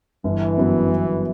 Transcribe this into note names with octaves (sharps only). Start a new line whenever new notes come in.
G1 E3
F#2 F#3 B3
G1